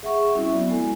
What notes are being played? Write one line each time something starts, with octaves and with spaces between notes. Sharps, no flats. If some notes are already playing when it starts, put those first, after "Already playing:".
G#4 E5 F#5 C#6
E5
G3 C4 C#4 E4 F#4
F#3 B3 F#4 D5
G#3 E4 A4 G#5